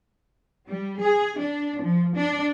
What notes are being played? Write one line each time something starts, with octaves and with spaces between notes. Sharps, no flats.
G3
G#4
D4
F3
D4